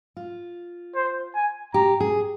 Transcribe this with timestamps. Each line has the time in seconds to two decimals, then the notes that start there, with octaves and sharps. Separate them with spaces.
0.17 F4
0.95 C5
1.35 G#5
1.74 G4 A#5
2.00 G#4